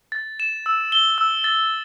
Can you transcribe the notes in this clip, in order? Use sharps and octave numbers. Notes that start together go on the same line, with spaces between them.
A6
E7
E6
G7
E6
A6